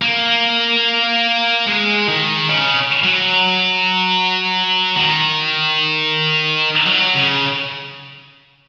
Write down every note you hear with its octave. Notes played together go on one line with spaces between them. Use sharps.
A#3
G#3
D#3
C#3
F#3
D#3
F#3
C#3